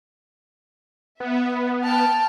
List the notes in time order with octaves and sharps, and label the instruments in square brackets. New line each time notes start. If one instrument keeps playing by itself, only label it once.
[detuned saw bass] B3 [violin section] E5
[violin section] G5 A5 F6